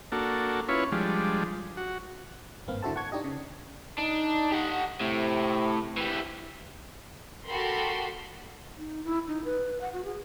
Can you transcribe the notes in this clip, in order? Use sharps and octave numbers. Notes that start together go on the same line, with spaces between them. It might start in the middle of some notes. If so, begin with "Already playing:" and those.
A#3 D4 F#4 A4
C#4 E4 F4 B4 C#5
F3 G3 G#3 D4
F#4
G#1 G2 A#3 C4 B4 F5
D3 E4 F#4 A4 C5 A5
F#5 A5 C#6 G#6
D4 D#4 G4 D#5
C#3
D4 D#4
G4 F#5
A2 C3
E3 G3
F#4 G4 A4 A#4 B5 C6
D#4
E4
D#4
B4
F#5
F#4
G#4